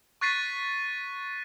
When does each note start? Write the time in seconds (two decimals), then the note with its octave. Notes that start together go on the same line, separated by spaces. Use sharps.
0.21 C#6 F#6 A6 B6 C7 D#7